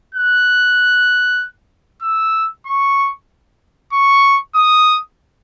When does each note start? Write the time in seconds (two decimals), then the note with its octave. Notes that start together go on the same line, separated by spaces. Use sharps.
0.15 F#6
2.03 E6
2.66 C#6
3.93 C#6
4.55 D#6